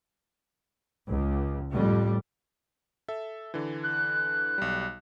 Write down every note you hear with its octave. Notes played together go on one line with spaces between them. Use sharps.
C#2
F2 A2 G3
A4 E5
D3 E3
F#6
B1 G3